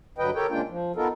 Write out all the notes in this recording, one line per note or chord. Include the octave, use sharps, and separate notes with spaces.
G2 D3 F#3 B4 D#5 G5
G4 A4 A#4 C#5 G5
C#3 G#3 A#3 D4 F4 G5
F3
B3 D#4 F4 A4 A#4